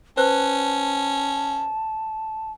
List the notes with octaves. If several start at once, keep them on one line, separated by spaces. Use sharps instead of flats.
C#4 B4 C5 A5 F#6